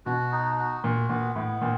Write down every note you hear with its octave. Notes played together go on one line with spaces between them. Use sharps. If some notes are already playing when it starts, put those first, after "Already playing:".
B2 F#4
D#4
F#4
A#2 F#4
A#2 B3
A2 B3
A#2 C4